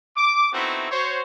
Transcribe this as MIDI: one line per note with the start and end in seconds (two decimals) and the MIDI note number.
0.17 0.50 86
0.52 0.89 57
0.52 0.89 59
0.52 0.89 60
0.52 0.89 63
0.52 0.89 64
0.52 0.89 66
0.92 1.22 66
0.92 1.22 72
0.92 1.22 73